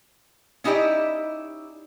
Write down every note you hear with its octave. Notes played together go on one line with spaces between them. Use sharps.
C#4 D#4 E4 G4 D5 D#5